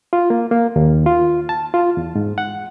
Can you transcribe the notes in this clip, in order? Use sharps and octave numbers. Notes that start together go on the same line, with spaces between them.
F4
A#3
A#3
D#2
F4
A5
F4
E2
G#2
F#5